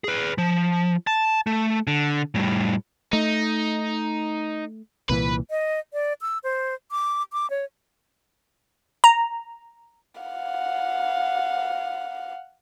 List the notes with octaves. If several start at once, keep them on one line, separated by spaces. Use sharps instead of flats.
G#4 B4
F3
A5
A3
D3
A2 G3
A3 D#4
C2 A#2 E3 B4
D#5
D5
E6
C5
D6
D6
C#5
A#5
F5 F#5